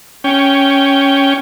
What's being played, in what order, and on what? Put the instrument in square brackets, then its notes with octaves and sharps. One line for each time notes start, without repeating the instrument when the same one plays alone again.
[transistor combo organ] C#4 G5